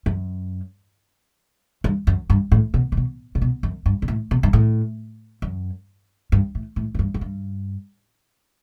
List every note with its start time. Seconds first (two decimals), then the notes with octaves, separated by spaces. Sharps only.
0.06 F#2
1.84 G2
2.07 F#2
2.30 G2
2.52 A2
2.74 B2
2.92 C3
2.97 B2
3.35 C3
3.42 B2
3.63 F#2
3.86 G2
4.02 B2
4.08 A2
4.31 B2
4.43 G2
4.53 A2
5.42 F#2
6.32 G2
6.55 A2
6.76 A2
6.95 A2
6.99 G2
7.14 F#2
7.21 G2